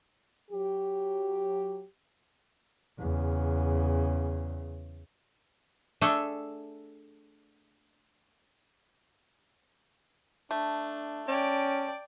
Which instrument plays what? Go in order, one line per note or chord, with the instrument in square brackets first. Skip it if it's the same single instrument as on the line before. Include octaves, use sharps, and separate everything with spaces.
[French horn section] F#3 G4
[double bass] E2 C#3
[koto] A3 D4 G#4 A4 E5 G5
[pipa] A3 [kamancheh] D4
[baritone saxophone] C#4 [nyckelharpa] D5 G5 [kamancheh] A5